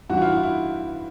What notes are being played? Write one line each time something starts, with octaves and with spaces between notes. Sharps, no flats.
G2 E3 F#4
E4
F4
E4
E4